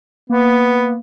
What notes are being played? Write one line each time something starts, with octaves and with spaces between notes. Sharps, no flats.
A#3 B3